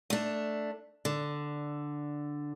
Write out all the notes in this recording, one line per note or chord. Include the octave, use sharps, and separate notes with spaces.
A3 D4
D3